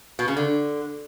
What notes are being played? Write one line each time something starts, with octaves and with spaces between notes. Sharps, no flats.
B2
C#3
D3